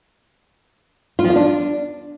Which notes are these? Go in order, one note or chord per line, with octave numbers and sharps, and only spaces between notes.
F4
F3
F4
D4